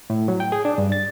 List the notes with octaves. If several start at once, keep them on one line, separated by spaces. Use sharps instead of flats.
A2
F#3
G5
G#4
D4
G2
A6